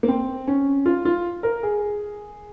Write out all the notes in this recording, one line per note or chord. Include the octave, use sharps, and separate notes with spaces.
A#3
C4
C#4
F4
F4
A#4
G#4